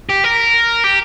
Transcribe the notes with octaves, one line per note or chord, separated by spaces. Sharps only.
G4
A#4
G4